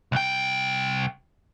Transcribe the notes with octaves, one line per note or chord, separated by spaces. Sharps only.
C2 G5